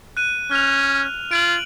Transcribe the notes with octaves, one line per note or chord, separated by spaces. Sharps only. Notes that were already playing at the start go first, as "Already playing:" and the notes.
F#6 D#7
C#4 F6 F7
F4 D7 F#7